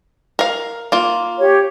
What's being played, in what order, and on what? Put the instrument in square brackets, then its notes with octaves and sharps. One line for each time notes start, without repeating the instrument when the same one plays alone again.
[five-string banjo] A#4 F5
A#3 F4
[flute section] G4 C#5